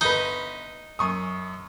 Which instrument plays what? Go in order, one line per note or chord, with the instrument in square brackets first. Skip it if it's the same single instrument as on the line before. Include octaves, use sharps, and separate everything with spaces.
[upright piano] G1 B4 [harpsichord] D#4
[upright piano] F#2 C#6 D#6